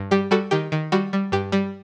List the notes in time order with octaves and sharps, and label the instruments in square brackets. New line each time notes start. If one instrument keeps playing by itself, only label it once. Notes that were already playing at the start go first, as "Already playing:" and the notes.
Already playing: [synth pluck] G2
G3 G4
G3 F#4 A4
D#3 G4
D#3
G3 F#4
G3
G2 G4
G3